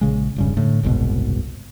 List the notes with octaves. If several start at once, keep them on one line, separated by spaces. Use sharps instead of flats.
A#1 C#3 G#3
E1 G2 C#3
A2 D3
F#1 C2 G#2 B2